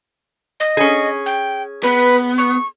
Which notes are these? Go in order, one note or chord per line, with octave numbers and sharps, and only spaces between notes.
D#5
C#4 G#4
G5
B3 B4
C#6